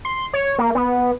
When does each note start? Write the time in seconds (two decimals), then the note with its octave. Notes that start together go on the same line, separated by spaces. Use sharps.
0.05 C6
0.33 C#5
0.59 A#3
0.75 B3